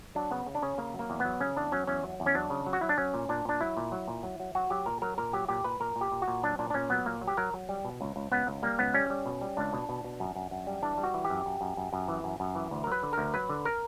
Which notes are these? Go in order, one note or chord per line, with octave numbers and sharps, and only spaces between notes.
F#3 D4
C#3 B3
C#3
D4
C#3 C#4
C#3 A#3
F#3
A#3
E2
F#3 B3
C#3 C#4
E2 D4
F#3 C#4
E2 C#4
F#3
E2
C#4
F#3 D4
C#3
F#3
F#4
F#3 E4
D4
F#3 C#4
A#2
A#2 D4
A#2 D4
F#3 E4
A#2
F#3
A#2
F#3
F#3
F#3 F#4
F#3 G4
A#2 A#4
F#3 A#4
A#2 A#4
F#3 G4
A#2 G4
A#2 B4
A#2 A#4
A#2
G4
A#2
F#4
A#2
F#3 D4
A#2 D4
D4
A#2 C#4
F#3 B3
A#2 A#3
F#3
G4
F#3 A#4
F#3
G3
B2
C#2
C#2
C#2 B3
C#2
G3 A#3
C#2 B3
G3 C#4
G3
B2
G3
C#2 D4
B2
B2
B2
F#2
F#2
F#2
G3
E3 D4
G3
F#4
E3
G4
F#2
F#2
F#2
F#2
F#2
E3
F#2
F#2
E3
D2
A#4
F#3 B4
D3
D2 A#4
F#3 B4
D3
A#4